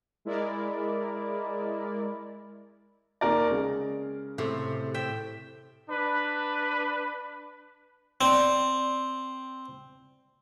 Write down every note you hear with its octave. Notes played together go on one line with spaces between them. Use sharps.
G#3 E4 A#4 D5
D#2 A#4 D5
C#3 G#3
A2 C3
E5 G5
D4 B4
C4 D5